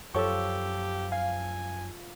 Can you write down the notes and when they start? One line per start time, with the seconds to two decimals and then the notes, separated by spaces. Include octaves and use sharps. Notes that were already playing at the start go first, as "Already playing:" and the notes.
0.15 F#2 F3 G4 A4 C#5 C#6 E6
1.12 F5 G#5